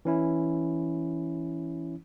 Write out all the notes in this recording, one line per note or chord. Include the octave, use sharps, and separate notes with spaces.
E3 C#4 E4